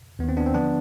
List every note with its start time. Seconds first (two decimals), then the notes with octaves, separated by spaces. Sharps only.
0.19 D#2 D#3 B3
0.29 C4
0.37 B3 D4
0.46 C4
0.54 D3 F3 B3 D4